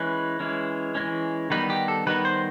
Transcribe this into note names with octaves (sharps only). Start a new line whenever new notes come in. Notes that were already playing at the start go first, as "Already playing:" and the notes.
Already playing: E3 G#3 C#4 B4
E3 G#3 C#4
E3 G#3 C#4
D#3 G3 B3 D#4 B4
G4
A4
D#3 G3 B3 D#4 B4
C5